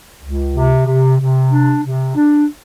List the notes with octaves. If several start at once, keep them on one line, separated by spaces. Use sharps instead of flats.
C#2
C3
C3
C3
D4
C3
D4